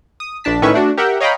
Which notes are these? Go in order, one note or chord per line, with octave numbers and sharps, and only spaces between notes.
D#6
A#1 D4 A5 B6
A2 D#3 C#4 B4 E5 C#6
A3 D4 F#4
G4 A#4 E5 F#5 G5
C#5 D#5 F5 G5 A#5 B5